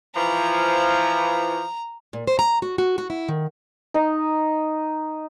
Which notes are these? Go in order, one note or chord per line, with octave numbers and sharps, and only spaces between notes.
E3 F3 A#5
A#2
C5
A#5
F#4
F#4
F#4
E4
D#3
D#4